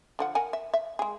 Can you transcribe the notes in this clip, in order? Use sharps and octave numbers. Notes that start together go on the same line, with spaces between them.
D3 F3 F#5
A#4 F#5 G#5
E5
E5
G#3 G#4